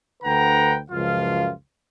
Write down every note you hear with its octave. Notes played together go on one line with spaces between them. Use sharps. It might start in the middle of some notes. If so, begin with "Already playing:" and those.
D2 D3 B4 F#5 G5 A#5
C#2 F#2 F3 F4 F5